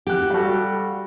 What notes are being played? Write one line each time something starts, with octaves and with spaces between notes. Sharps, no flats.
G4 F#5 F#6
G3 F#4 A4 F5